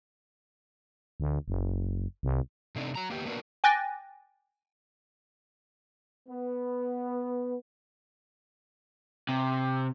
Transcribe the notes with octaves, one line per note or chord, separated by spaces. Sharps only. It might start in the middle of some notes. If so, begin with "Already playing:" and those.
D2
F#1
C2
C3 A3 C4 D4 D#4
F#3 A#5
A#3 B3 G4
A#3 B3 D4 F#4 A#4
G5 G#5 D6 F#6 A6 A#6
B3
C3